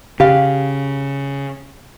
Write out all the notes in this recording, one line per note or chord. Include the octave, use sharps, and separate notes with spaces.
C#3 G4 F5